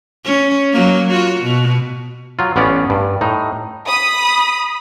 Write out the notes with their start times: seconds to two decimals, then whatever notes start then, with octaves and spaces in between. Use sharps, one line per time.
0.25 C#4
0.73 F#3 A#3
1.11 F4 F#4
1.41 B2
2.39 F#3 F4
2.56 A1 B3 C#4 D5 F5
2.90 G2
3.21 A2 D#4
3.88 B5 D#6